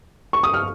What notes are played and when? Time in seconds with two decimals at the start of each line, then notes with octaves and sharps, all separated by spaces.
0.33 C#6
0.43 D#6
0.54 F6